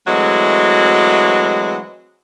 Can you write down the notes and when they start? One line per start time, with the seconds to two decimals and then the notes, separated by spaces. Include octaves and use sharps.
0.07 E3 F#3 G#3 A3 C4 F#4